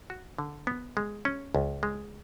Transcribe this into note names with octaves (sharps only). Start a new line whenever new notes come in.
F#4
D3
B3
G#3
C#4
C#2
G#3